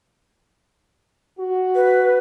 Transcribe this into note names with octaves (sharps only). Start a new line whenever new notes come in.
F#4
B4